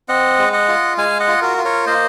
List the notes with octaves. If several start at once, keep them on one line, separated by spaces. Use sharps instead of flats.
C4 D#5 F#5
G#3
D#5 F#5
F4
G#3 F5 G#5
D#5 F#5
F4
F#4 A#4
F4
A#4 C#5
A#3 C5 D#5